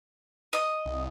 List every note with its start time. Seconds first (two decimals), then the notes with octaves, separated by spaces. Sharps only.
0.53 D#5 D#6
0.86 C2